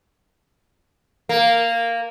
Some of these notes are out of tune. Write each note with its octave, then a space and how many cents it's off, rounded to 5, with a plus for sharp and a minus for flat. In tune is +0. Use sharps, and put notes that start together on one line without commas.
A#3 -10